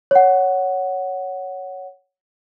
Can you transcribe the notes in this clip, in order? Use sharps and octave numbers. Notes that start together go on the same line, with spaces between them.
C#5 F#5